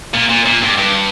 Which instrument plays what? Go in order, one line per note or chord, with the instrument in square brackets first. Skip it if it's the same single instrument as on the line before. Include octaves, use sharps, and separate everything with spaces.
[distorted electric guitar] A#2
A#2
A#2
G2
G2